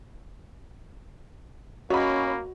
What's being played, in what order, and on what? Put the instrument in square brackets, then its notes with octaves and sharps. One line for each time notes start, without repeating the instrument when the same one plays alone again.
[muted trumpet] A#3 [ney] C#4 [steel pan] F#4 [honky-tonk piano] C#5 D#5 B5